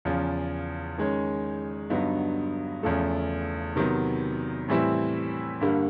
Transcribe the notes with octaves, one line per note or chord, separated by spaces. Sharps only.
E2 C#3 F3
D#3 G#3 C#4
G2 D3 F#3 B3 D#4
E2 C#3 F3 A3
C3 D#3 F#3 B3
A2 E3 G3 C4 E4
G2 D3 G3 A#3